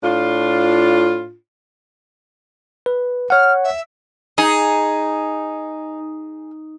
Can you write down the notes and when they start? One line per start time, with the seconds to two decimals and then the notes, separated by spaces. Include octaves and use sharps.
0.03 A2 D4 F4
2.86 B4
3.30 C#5 F#5 F6
3.64 E5
4.38 D#4 G#4